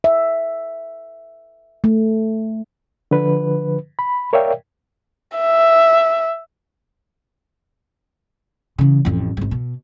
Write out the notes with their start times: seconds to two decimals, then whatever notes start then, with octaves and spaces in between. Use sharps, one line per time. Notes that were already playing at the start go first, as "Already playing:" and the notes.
0.04 E5
1.84 A3
3.11 D3 F3 B4
3.99 B5
4.33 A#4 C#5 D5 E5 F5 G5
5.38 E5
8.78 C#3 E3
9.05 A1 F2
9.37 G#1 G#2
9.51 B2